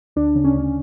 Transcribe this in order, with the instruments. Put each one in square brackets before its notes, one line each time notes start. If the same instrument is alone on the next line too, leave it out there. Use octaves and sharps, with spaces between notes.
[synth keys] D2 D4
C#3
C#4
D2